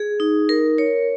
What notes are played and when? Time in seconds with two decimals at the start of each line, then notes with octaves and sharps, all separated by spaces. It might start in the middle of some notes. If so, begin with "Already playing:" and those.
Already playing: G#4
0.20 D#4
0.49 A#4
0.78 C#5